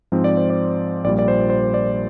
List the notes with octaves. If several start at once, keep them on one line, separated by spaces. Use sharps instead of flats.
G#2 F3 C4
D5
C5
D5
A#1 A#2 G3 D5
D5
C5
C5
D5